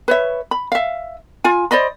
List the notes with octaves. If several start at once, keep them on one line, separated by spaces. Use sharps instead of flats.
B4 C#5 E5
B5
E5 F5
F4 G#5
C5 D5 D#5 B5